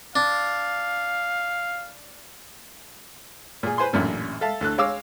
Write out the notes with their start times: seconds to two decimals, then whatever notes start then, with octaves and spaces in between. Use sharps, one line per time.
0.16 D4 F5
3.63 A#2 G#4
3.78 B4 C5 G#5 C6
3.93 A1 F#2 A#2 D3
4.41 A4 E5 F5 A5
4.61 D2 A4 F#6
4.78 G#3 C#5 F5 D6 E6